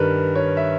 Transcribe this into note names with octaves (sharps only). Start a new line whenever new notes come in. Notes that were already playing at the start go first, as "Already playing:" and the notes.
Already playing: G2 D#3 G3 A#4 B4
C#5
E5